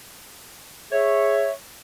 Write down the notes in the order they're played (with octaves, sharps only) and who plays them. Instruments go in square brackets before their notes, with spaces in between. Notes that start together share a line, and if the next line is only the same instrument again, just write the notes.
[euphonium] G#4 [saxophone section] C#5 [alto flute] E5